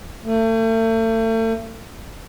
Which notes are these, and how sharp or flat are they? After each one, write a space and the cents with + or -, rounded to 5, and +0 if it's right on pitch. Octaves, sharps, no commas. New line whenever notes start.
A3 +40